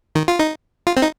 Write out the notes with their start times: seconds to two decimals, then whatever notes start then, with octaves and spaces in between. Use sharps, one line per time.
0.15 D#3
0.28 F4
0.39 D#4
0.87 F4
0.97 C4
1.02 D#4